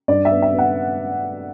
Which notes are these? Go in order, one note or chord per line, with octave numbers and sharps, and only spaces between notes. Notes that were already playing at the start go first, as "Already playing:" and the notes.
G2 D5
E5
B3
E5
B3
F#5